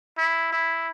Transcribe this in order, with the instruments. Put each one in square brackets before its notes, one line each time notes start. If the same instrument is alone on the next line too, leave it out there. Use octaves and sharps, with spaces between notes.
[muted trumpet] E4
E4